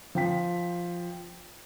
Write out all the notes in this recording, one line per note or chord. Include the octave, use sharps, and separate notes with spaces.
F3 G5 B6